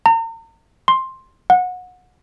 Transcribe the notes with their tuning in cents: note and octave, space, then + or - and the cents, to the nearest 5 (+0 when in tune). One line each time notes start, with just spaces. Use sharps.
A#5 -40
C6 +10
F#5 -25